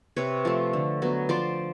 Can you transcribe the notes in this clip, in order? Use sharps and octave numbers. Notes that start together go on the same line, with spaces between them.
C3 B4 C#5
F3 A3
D3
F#3 B3
F3 C5 D5